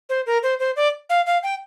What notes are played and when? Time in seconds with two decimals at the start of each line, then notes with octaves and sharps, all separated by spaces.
0.09 C5
0.26 A#4
0.43 C5
0.59 C5
0.76 D5
1.10 F5
1.26 F5
1.43 G5